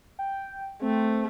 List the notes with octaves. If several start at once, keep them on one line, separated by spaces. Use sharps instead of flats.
G5
A3 C4